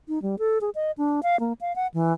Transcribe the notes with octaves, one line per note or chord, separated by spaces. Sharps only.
D#4
G3
A4
G#4
D#5
D4
F5
A#3
F5
F#5
E3